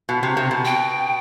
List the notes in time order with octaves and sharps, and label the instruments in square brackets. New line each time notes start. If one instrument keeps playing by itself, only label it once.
[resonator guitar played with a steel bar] B2
C3
C3
B2
[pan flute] G5